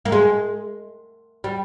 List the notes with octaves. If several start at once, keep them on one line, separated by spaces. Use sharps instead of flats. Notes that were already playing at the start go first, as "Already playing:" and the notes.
A#3
G#3
G3